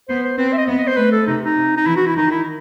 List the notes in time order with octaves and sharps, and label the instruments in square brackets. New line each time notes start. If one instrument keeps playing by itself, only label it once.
[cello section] B3 [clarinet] C5
[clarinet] C5
[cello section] C4 [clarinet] B4
[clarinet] C5
E5
D#5
[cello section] B3
[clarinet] D#5
C5
[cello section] A3 [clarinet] B4
[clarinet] A4
[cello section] C3 [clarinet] D#4
[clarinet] D#4
[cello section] C3
[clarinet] D#4
[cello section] E3 [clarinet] E4
[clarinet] F#4
E4
[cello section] D#3 [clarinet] D#4
[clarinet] E4